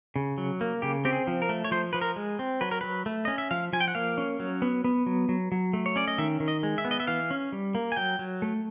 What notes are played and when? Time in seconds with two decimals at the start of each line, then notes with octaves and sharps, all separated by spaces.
0.16 C#3
0.38 F#3
0.61 A#3
0.82 C#3 G4
1.05 C4 G4
1.13 G#4
1.27 F3
1.42 A#4
1.49 A3
1.64 C#5
1.71 F3 C5
1.93 F3 B4
2.01 A#4
2.16 G#3
2.39 C4
2.61 F#3 B4
2.71 A#4
2.81 F#3 B4
3.06 A3
3.25 C#4 D#5
3.38 E5
3.51 F3 F5
3.73 F3 G#5
3.80 G5
3.88 F#5
3.95 A#3 F5
4.18 C#4
4.40 F#3
4.62 B3
4.84 B3
5.06 F#3
5.29 F#3
5.52 F#3
5.73 A3
5.86 C#5
5.96 C#4 D5
6.08 D#5
6.18 D#3 E5
6.40 D#3
6.48 D#5
6.63 G#3
6.78 E5
6.85 B3
6.91 D#5
7.00 E5
7.07 E3 F5
7.31 C#4
7.52 G3
7.75 A#3
7.92 G#5
7.96 F#3 G5
8.19 F#3
8.42 A3